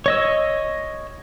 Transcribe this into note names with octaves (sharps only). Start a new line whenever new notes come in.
C#5 D#5 E6